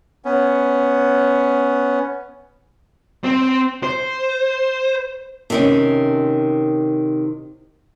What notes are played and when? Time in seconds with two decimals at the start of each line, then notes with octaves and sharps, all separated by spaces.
0.25 B3 C#4
3.24 C4
3.83 C5
5.50 C3 D#3 C#4